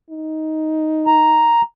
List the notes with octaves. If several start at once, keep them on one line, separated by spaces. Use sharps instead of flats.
D#4
A#5